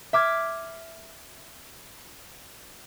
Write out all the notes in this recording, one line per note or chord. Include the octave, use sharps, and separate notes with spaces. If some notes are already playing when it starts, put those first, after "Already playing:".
E5 D6 F6 G#6